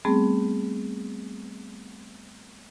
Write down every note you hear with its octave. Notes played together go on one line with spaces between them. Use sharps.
G3 A3 B3 C4 G#4